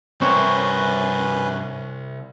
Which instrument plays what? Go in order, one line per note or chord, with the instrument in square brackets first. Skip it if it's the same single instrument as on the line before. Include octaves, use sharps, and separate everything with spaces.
[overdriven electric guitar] C2 [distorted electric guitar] G2 A#4 [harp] C4 C#5 [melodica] C#4 B4